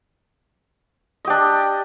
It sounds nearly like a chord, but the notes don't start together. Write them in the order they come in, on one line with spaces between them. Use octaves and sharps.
D#5 G4 D4